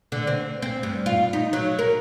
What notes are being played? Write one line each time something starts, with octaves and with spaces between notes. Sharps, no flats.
D3
C4
C4
G2
F4
D#4
F#3
A#4